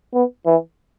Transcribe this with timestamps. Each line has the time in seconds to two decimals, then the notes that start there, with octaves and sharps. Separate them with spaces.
0.14 B3
0.46 E3